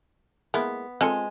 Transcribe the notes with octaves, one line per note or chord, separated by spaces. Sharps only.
G#3 A#3 B3 E4
G#3 C4 F4 A4